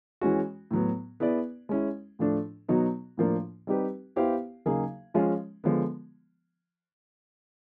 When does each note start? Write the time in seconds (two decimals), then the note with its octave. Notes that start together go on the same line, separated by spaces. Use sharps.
0.21 E3 G#3 C#4 F#4
0.71 A2 F#3 B3
1.20 B3 E4 G#4 B4 D5
1.69 G#3 C#4 E4
2.19 A2 F3 A3 D4
2.68 B2 F#3 B3 D#4 F#4
3.17 A2 F3 A#3 D4
3.67 G3 C4 D#4 G4 B4
4.16 B3 E4 G4 C5 F5
4.65 C#3 F#3 A#3 D#4 G#4
5.14 F3 G#3 C#4 F4
5.64 D3 F3 G#3 B3